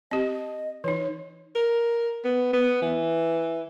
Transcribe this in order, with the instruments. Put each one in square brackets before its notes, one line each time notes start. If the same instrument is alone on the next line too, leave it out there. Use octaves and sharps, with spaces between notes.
[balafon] C4 G4 [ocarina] D#5
[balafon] E3 D#4 [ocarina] C#5
[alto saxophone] A#4
B3
B3
E3